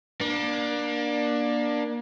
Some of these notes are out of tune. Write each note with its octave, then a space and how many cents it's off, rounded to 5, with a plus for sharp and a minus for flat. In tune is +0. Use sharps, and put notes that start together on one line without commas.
A#3 +30 D4 +10